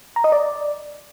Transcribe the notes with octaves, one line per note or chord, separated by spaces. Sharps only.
A#5
D#5
D5